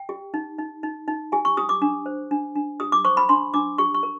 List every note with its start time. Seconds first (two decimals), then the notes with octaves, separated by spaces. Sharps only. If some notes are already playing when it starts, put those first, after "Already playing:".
Already playing: G5
0.09 G4
0.34 D#4
0.59 D#4
0.83 D#4
1.08 D#4
1.32 G4 G#5
1.45 C#6
1.57 G4 D#6
1.69 D6
1.82 D4
2.06 C5
2.31 D4
2.55 D4
2.80 G4 D#6
2.92 D6
3.05 C5 C#6
3.17 B5
3.29 D4 C6
3.54 D4 D6
3.78 G4 C#6
3.94 C#6
4.03 A#4